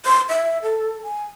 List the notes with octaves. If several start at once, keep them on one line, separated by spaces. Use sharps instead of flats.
C6
E5
A4
G#5